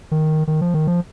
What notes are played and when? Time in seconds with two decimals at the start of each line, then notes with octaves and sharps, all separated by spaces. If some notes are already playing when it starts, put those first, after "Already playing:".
0.11 D#3
0.47 D#3
0.61 F3
0.74 D#3
0.87 F3